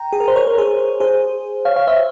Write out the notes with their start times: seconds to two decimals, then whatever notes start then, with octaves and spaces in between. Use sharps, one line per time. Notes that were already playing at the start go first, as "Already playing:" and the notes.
Already playing: G5 A#5
0.13 G#4
0.20 A#4
0.28 C5
0.36 A#4 C#5
0.47 A#4 C#5
0.57 G#4 C5
1.00 G#4 C5
1.65 C#5 F5
1.76 C#5 F5
1.87 C5 E5